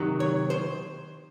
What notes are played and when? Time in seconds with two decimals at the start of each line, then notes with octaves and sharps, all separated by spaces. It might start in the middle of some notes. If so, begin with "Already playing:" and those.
Already playing: C3 D#3 F#3
0.20 C#5
0.50 C5